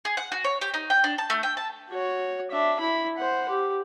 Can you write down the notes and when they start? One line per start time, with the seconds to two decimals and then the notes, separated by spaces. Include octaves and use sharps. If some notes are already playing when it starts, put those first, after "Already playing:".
0.05 G#4
0.17 F#5
0.32 F#4
0.44 C#5
0.61 G4
0.74 D#4
0.90 G5
1.04 D4
1.18 A5
1.30 A3
1.43 G5
1.57 A5
1.90 F#4 C#5
2.51 D4 E5
2.80 E4 B5
3.17 C5 F#5
3.49 G4